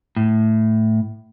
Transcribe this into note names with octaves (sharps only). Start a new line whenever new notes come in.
A2